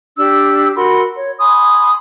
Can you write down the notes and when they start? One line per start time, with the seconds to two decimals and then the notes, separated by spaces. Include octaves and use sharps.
0.17 D4 G4 E6
0.76 F#4 A#4 B5 C6
1.14 C#5
1.39 G#5 B5 C6 D#6